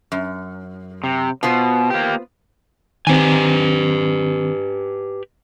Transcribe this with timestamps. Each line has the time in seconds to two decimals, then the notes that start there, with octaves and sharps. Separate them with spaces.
0.12 F#2
1.04 C3
1.43 B2 B3 F4 C5
1.90 A#3 G4
3.07 D#3 C4 G4 B4 G#5